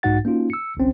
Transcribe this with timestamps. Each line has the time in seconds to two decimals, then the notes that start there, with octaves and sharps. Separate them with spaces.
0.03 B1 G#2 D#4 F#4 F#5 A6
0.25 A#3 C#4 D#4 F4 F#4
0.50 E6 C#7
0.77 G1 C2 C4 C#4